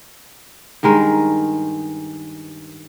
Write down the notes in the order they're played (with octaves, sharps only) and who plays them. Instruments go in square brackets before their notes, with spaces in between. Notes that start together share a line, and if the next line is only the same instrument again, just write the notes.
[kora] G2 D#3 G#3 A#4